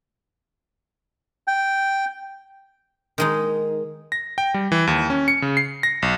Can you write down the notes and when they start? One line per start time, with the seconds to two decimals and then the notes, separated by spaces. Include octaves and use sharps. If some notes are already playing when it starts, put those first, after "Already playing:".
1.48 G5
3.18 D#3 G#3 D#4
4.12 A#6
4.38 G5
4.54 G3
4.72 E3
4.87 D#2
5.10 C#4
5.28 C#7
5.42 C#3
5.57 C7
5.83 A#6
6.02 B1